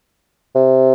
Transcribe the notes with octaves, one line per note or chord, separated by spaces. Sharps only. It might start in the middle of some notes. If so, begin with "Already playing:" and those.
C3